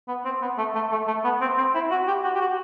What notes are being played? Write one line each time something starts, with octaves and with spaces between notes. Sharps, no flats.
B3
C4
B3
A3
A3
A3
A3
B3
C4
C4
E4
F#4
G4
F#4
G4
F#4